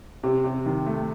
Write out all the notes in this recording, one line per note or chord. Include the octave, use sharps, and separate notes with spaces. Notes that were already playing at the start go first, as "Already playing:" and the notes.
C3
C3
D#3
A3